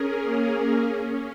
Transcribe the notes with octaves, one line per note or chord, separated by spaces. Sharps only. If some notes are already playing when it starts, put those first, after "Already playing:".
Already playing: C#4 G#4 A#4
A#3
A#3
C#4